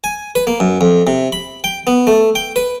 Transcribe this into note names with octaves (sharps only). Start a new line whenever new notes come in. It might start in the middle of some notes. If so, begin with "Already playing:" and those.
G#5
B4
A#3
F#2
F2
C3
B5
G5
B3
A3
G5
B4